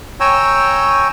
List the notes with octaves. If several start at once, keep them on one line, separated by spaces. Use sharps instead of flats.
C#5 G5 G#5 A#5 E6